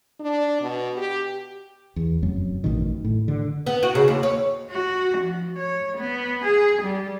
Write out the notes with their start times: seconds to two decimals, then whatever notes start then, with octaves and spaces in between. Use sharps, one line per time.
0.20 D4
0.62 B2
0.97 G4
1.96 E2
2.23 F1 F#2 F#3
2.64 A1 F#2 B2 D#3
3.04 A2
3.28 D3
3.66 B3
3.83 F#4
3.95 C#3
4.08 D#2
4.23 C#5
4.71 F#4
5.19 F3
5.59 C#5
5.98 B3
6.45 G#4
6.83 G3